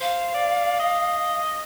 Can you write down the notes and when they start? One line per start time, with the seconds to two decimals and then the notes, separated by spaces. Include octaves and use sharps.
0.01 C5 F5
0.35 D5
0.80 D#5